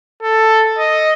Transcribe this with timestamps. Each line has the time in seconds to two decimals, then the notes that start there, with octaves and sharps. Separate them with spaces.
0.23 A4
0.79 D#5